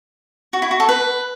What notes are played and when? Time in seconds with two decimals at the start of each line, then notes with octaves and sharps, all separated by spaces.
0.53 F#4
0.62 E4
0.71 F#4
0.80 A4
0.89 B4